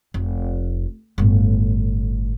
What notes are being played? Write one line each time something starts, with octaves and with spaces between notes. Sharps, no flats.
F1
G1 A2